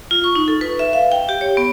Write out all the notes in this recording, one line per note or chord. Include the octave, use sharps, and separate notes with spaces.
F4
C#6
D#4
A4
B4
E5
F5
G5
G4
C#5
B3